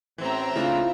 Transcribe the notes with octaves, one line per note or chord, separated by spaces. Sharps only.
A1 A2 E3 C4 E5 A#5
C#3 A3 D4 E4 F4